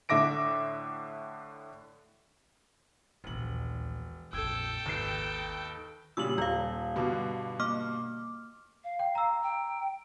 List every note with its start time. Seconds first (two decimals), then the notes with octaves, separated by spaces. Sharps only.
0.09 A2 D3 E5 D6 A#6 D7
3.24 E1 A#1 D#2 F#7
4.33 A#1 F2 A4 G5 E6 G#6
4.86 G#1 D#2 B4 C7
6.17 A#2 C#3 G3 E6 F#7
6.38 D#1 F4 F5
6.96 G2 B2 D3
7.60 A#3 D6 F6
8.84 F5
8.99 G5
9.15 A#5 E6
9.43 G5